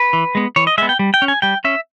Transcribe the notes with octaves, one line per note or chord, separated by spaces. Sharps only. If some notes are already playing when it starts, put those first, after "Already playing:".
Already playing: B4
E3
G#3 B3
E3 C#5
D#5
G#3 B3 E5
G5
G3
G5
C#4
G#5
G3 G5
C#4 E5